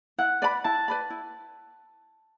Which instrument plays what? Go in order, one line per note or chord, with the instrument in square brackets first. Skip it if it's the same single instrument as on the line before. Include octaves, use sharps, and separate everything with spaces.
[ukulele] E4 [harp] F#5
[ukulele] B4 D5 B5
[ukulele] E4 [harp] A5
[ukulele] B4 D5 B5
E4